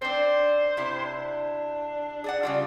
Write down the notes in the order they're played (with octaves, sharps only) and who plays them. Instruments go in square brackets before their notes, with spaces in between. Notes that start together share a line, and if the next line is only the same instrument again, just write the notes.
[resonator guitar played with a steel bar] C4 D4 [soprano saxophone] C5
[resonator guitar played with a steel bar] C3 E4
[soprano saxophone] D4
[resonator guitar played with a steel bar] G#4 D5 F#5
C#3 G3 F4